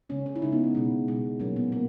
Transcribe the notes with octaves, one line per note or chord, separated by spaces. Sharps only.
C#3 G#3 C#4
C#4
E4
C#3 G#3 D#4
B3
B3
B2 G#3
B2 G#3
A#2 F#3 A#3 C#4
B3
A#3